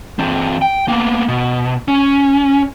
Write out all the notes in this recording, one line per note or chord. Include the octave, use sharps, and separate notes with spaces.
E3 C4
G5
A#3 B3
B2
C#4